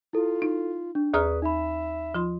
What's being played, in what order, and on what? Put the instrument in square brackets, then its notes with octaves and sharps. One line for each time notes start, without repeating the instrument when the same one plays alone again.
[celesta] E4 A4 [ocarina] F4
[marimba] D#4
[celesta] D4
[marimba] D#2 A#5 F6 [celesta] G#4 D5 D#6 [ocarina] B4
[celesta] D#4 B5 [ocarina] E5
[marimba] F3 F4 C6